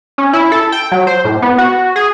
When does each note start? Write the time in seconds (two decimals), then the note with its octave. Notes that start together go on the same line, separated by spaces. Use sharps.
0.18 C#4
0.33 E4
0.52 A4
0.72 G5
0.92 F#3
1.07 C5
1.24 A2
1.42 B3
1.58 F#4
1.96 G#4